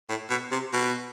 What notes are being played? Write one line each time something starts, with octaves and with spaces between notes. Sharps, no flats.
A2
B2
C3
B2